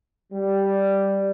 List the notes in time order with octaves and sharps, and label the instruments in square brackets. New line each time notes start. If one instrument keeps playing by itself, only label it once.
[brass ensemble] G3